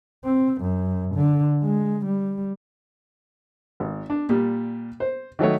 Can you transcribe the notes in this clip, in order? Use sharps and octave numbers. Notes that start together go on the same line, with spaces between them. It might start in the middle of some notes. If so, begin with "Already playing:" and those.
C4
F#2
D3
G#3
G3
G#1
D4
A#2 G3
C5
D#3 F#3 A3 C#5